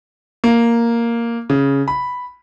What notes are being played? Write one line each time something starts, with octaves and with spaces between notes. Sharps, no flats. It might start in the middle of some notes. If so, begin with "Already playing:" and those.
A#3
C#3
B5